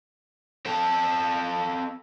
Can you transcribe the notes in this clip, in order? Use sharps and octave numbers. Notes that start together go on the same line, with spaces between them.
C4 A4